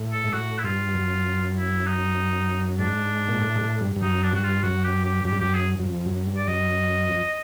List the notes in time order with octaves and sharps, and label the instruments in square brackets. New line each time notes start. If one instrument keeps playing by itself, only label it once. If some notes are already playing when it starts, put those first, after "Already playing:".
Already playing: [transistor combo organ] A2
[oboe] A4
[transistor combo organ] G#2
[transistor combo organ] A2 [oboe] F#4
[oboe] E4
[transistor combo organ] G2 [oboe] F4
[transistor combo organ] F#2
[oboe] E4
D#4
[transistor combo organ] G#2 [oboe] D4
[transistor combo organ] A#2
A2
G#2
A2
G2
G2
[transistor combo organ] F#2 [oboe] D#4
[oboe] D4
[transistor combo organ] G2 [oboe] F#4
[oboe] F4
[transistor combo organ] F#2 [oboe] F#4
[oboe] G4
G4
[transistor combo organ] F#2 [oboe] G4
[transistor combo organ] G2
[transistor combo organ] F#2 [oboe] G4
[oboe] G#4
[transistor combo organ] F#2
F2
F#2
G2
[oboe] D5
[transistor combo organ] F#2 [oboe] D#5
[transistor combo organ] F2